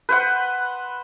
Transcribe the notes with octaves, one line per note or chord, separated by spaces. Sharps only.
B4 C5 F#5